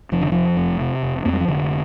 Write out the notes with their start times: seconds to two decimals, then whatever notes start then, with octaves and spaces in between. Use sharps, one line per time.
0.12 F1 F3
0.21 D3
0.32 F2 F3
0.57 F1
0.80 C3
1.03 F1
1.25 F2 A#3
1.33 G3
1.40 F3
1.48 F1 D3